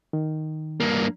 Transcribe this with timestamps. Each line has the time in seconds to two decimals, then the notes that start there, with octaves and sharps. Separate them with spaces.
0.13 D#3
0.80 G2 A#3